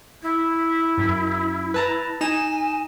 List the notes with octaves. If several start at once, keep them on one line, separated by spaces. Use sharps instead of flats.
E4
F#2
B4 A5 A#5
D#4 G#5 A#5 E7